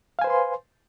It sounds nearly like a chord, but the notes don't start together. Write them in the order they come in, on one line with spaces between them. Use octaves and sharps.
F5 G#5 C5 B4 C6